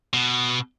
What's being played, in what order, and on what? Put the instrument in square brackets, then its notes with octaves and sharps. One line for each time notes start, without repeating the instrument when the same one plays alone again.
[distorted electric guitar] B2